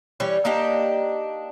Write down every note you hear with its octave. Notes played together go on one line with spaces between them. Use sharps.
E3 G3 C#4 C#5
A#3 D4 D#4 G4